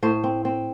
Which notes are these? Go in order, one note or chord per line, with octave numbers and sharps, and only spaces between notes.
A2 C5
C4
C4